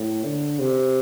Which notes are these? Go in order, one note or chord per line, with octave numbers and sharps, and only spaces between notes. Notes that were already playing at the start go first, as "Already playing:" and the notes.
Already playing: A2
D3
C3